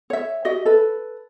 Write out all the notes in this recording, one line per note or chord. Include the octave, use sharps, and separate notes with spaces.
C#5 E5
F#4 G4 D#5 E5
A4 B4